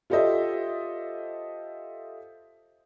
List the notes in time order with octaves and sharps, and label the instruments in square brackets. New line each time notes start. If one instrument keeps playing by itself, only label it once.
[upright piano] F4 G4 A4 C5 D#5 E5